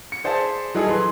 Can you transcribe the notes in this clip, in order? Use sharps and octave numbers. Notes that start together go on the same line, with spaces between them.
C#7
G#4 C5 D5 E5 A5
F#3 G3 D#4 E4 G#4 A4
E3 C6